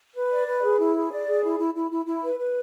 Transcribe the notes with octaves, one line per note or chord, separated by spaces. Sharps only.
B4
D5
B4
G#4
E4
G#4
D5
G#4
E4
E4
E4
E4
E4
B4
B4